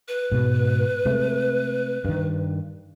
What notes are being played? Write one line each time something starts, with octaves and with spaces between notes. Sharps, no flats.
B4
G#2 B2 G#3
C3 G#3 A3
G2 D#3